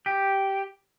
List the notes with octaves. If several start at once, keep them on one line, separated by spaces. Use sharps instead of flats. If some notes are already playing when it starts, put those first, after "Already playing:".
G4